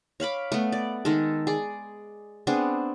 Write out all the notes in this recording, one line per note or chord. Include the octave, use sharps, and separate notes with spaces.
C#5 F5 B5 D6
A3 B3
D5
D#3 G#3 A4
G#4 D5
B3 C4 D4 G#4